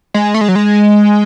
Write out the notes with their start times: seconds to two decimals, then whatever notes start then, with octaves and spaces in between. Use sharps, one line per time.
0.14 G#3
0.34 A3
0.41 G#3
0.48 F#3
0.56 G#3